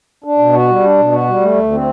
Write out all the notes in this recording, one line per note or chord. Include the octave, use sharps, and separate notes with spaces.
D4
B2
F#4
G3
D4
B2
F#4
G3
A3
D2
C4